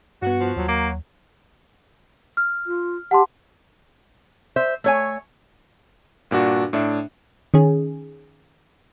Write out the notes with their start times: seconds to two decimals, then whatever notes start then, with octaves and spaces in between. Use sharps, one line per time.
0.22 G2 B3 F#4
0.40 F3
0.56 D#2 F#3
0.68 A#3
2.37 F6
2.66 F4
3.11 G4 F#5 A5 C6
4.56 C5 E5
4.84 A3 C#5 G#5
6.31 G2 A#2 D4 F#4
6.73 A2 D4 E5
7.54 D#3 C#4 G#4